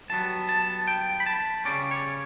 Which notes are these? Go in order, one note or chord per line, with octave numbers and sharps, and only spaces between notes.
G2 F#3 B3 A5
A5
G5
B5
A5
C#3 G3 C#4 D5
C#5